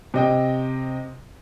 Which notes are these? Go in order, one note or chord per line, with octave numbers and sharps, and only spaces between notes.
C3 D#5 G5